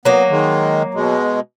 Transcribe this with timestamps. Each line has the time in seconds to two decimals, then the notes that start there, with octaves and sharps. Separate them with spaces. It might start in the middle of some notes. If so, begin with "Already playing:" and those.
0.05 F#3 A#3 B3
0.30 D#3 G#3
0.94 B2 G#3